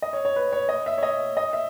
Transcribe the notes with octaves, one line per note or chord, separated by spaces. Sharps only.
D#5
C#5
C#5
B4
C#5
D#5
E5
C#5
D#5
D#5
E5